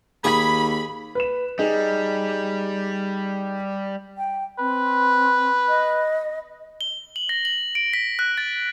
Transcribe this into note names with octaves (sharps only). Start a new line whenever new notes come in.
D#2 G#4 B5
B4 E7
G3 D#4 G#4
G5
C4 B4
D#5
G7
F#7
A#6
F#7
D7
B6
F#6
A6